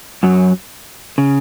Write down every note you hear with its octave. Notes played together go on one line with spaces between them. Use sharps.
F#2 F#3
C#3